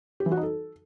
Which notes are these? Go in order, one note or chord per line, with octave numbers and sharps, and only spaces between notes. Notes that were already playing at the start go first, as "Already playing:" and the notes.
G4
E3
F#4
D#4
A4